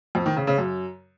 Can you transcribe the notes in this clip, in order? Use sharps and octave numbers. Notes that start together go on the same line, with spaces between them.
F2
D#3
C#3
C#3
F#2